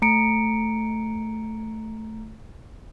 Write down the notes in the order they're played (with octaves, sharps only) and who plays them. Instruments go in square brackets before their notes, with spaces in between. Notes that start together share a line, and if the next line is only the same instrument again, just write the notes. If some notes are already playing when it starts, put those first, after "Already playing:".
[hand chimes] A3 A#5 C#7 D7